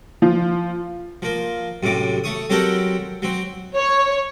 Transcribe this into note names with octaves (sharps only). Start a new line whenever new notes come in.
F3
F3 A#3
F#2 A2 C3 D6
A3 C#6 D#6
F#3 C4 G4 A4 A#4 F#5
F#3 C4
C#5